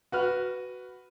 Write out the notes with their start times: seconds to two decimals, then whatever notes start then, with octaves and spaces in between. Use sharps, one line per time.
0.12 F#4 B4 F6